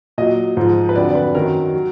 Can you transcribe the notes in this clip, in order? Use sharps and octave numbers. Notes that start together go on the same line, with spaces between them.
A#2 F#3 D#5
G#2 F3
B4
F2 D3 F#3 D5
D5
B4
F#2 D#3 F#3 A#4
F#3